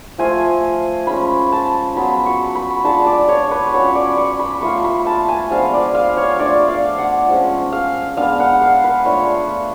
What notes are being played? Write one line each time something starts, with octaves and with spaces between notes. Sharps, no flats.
F3 A3 F4 G#5
G#3 C#4 F4 B5
A5
F#3 B3 F4 B5
C#6
B5
G#3 D4 F4 A5
D5
C#5
B4
F#3 C#4 F4 C#5
D5
C#6
B5
A3 F4 C#6
B5
A5
G#5
F3 G#3 B3 D4 F5
D5
F5
C#5
A3 D4 F4 D5
F5
F#5
F3 G#3 C#4
F5
G#3 B3 D4 F5
F#5
F5
B4
A3 D4 F4 C#5